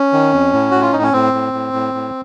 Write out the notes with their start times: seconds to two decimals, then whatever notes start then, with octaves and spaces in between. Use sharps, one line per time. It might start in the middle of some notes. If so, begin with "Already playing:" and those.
Already playing: C#4
0.13 D#3
0.33 F2
0.53 A2
0.71 A2 F#4
0.82 F4
0.93 A2 D#4
1.03 C#4
1.13 A2 C4
1.33 A2
1.53 A2
1.73 A2
1.94 A2